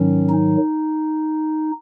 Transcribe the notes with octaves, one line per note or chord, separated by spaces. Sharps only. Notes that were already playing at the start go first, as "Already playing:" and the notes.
Already playing: G#2 D#3 F#3 C#4
D#4